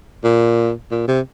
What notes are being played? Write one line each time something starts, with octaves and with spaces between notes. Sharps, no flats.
A#2
A#2
C3